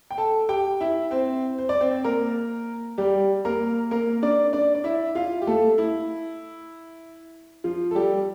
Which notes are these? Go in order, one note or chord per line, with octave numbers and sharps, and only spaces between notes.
G5
A4 A5
G4 G5
E4 E5
C4 C5
C5
D5
C4 C5
A#3 A#4
G3 G4
A#3 A#4
A#3 A#4
D4 D5
D4 D5
D5
E4 E5
F4 F5
G4
A3 A4
E4
F3 F4
A4
G3 G4